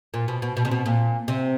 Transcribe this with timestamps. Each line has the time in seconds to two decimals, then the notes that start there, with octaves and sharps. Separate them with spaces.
0.14 A#2
0.28 B2
0.42 B2
0.57 B2
0.65 C3
0.71 B2
0.86 A#2
1.28 C3